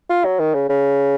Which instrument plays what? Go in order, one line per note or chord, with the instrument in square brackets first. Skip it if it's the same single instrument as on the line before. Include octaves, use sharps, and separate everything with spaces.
[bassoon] F4
F#3
D#3
C#3
C#3